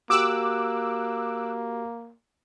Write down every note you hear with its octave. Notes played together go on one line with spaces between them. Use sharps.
A#3 F#4 G4 D6 E6 F#6